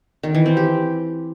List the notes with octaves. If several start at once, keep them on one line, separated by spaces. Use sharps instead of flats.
D#3
E3
C4
G4